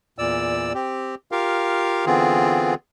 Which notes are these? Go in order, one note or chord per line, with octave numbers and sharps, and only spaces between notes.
E2 A#2 D5 E6
C4 G4
F4 G4 A#4 F5
D3 E3 B3 C4 F4 G#4